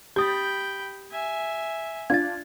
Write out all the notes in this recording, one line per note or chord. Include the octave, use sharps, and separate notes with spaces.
G4 G5 B5 D#6 G6 A6
E5 G#5
D4 F4 G#6 A6